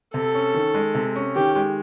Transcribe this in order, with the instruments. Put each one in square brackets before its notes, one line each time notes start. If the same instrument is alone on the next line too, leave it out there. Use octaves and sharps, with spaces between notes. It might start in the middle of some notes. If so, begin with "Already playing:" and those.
[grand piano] C3 [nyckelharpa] A4
[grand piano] C#4
D#3
G#3
C3
C#4
[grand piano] D#3 [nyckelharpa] G4
[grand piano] G#3